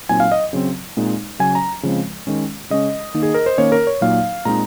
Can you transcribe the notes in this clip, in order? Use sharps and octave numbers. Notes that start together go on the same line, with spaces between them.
A#2 F#3 C4 D#4 G#5
F5
D#5
C#3 F#3 C4
A#2 G#3 C4 D#4
C#3 F#3 C#4 G#5
A#5
C#3 F3 G#3 C4
D#3 G#3 C#4
C#3 G#3 C#4 D#5
D#3 A#3 D#4
G#4
A#4
C5
D#3 A#3 C#4 C#5
A#4
C#5
A#2 F#3 A#3 D#4 F5
A#2 G#3 C4 D#4 A#5